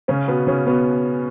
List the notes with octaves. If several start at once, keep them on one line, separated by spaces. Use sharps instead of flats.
C#3 C#4
B2 B3
C#3 C#4
B2 B3